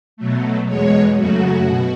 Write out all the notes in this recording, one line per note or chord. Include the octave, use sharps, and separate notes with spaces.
B2 F#3 A3
E2 B2 G#3 C#5
F#2 C#3 F#3 A3 F#4
B2